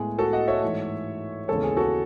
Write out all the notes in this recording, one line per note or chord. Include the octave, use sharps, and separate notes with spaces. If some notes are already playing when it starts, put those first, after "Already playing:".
Already playing: A2 G#3 B3 G#4
F#4 A4
D#5 F#5
C#5 E5
G#2 E3 A3
D#2 C#3 E3 G#3 B3 A4 C#5
G#4
F#4 A4